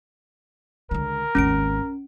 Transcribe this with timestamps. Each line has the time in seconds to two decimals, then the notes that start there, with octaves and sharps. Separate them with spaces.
0.91 C#2 D3 A#4
1.35 G#1 D#2 C#4 D7